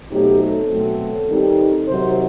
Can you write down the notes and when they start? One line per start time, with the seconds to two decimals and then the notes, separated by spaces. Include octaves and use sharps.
0.12 B2 F#3 A3 C4 D#4 G4
0.41 A4
0.70 B2 F#3 A3 C4
1.29 D#3 G3 C4 D#4
1.87 C3 D#3 F#3 C5